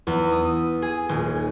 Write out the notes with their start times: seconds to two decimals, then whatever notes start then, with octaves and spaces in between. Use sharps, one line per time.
0.07 E2
0.32 D#6
0.82 G#4
1.09 D#1